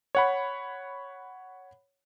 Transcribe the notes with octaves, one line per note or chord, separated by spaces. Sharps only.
C#5 F#5 B5